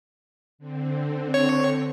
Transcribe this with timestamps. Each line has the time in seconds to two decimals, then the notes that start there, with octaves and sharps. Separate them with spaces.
0.58 D3 C4
1.34 C#5